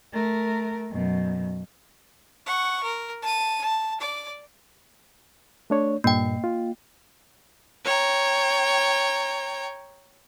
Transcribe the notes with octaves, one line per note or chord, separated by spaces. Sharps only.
A3 A#4
F#2 B2
F#5 C#6
A#4
A5 D#7
A5
D5 D6
A3 D4 C#5
G2 A#2 A#3 G5
F4
C#5 G5 A#5